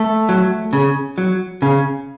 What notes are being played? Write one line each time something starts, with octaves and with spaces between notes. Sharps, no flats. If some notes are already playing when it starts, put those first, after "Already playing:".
Already playing: A3 A4
F#3
C#3
F#3
C#3